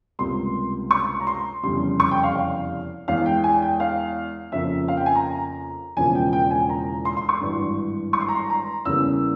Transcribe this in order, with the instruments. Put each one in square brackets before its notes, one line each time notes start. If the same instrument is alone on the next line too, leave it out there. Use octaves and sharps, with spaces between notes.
[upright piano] C#2 C3 G3 A#3 C6
C#6
A#5
C6
F1 E2 C#3 G3 C6
C#6
G5
F5
F5
E2 E3 G#3 F5
G5
G#5
G5
F5
F2 C#3 F3 A#3 E5
F5
G5
G#5
A#5
E1 E2 C#3 F3 A#3 G#5
G5
G5
G#5
A#5
C6
C6
C#6
G#1 G2 E3
C#6
C6
A#5
C6
A#5
E2 C#3 E3 G3 A#3 E6